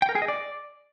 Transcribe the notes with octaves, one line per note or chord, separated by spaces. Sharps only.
G5
A#4
G#4
D#5
D5